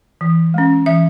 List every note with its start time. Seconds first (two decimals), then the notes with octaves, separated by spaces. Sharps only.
0.21 E3
0.54 G#3 C#4
0.86 E3 E5